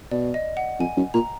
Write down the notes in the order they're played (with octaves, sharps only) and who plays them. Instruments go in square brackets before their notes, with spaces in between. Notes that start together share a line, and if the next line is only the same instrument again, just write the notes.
[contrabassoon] B2 [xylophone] D5
[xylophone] D#5
F#5
[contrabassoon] F2 [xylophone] G#5
[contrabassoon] F#2
[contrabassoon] A#2 [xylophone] A#5